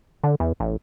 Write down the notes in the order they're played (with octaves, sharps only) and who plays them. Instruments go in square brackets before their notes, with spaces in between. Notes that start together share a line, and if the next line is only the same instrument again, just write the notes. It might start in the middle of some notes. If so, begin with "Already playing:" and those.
[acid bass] D3
E2
A1